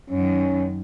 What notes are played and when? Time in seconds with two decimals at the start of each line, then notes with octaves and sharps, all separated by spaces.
0.10 F#2 D#3 C#4